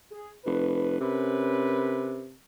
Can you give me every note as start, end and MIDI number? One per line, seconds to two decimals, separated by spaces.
0.11 0.33 68
0.45 0.96 29
0.45 0.99 71
1.00 2.34 48
1.00 2.26 61
1.00 2.26 70
1.00 2.26 71